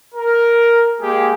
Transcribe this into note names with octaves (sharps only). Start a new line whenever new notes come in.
A#4
G#3 A#3 G4 G#4